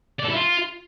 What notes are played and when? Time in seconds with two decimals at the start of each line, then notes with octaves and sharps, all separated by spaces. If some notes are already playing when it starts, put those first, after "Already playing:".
0.20 D5
0.25 A4
0.30 E4
0.35 F4